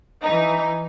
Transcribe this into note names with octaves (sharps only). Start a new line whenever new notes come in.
E3 D#4